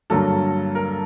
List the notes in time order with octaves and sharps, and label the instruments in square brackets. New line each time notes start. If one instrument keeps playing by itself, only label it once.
[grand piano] G2 D3 F#3 A#3 A4
A#4